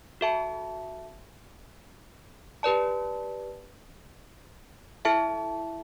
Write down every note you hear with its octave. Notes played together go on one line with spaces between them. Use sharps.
F#4 A4 E5 A5
G4 B4 D5 A5
E4 A4 E5 A5